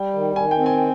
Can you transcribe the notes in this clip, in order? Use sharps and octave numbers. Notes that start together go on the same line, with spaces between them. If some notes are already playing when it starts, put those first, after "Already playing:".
Already playing: G3 G5
D#3
D#3 G#5
G5
C4
G#5